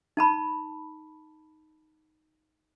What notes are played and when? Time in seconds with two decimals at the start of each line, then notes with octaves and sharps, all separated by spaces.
0.17 D#4 A5 B5